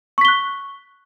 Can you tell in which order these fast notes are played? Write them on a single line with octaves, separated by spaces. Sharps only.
C#6 B6 G7 F#6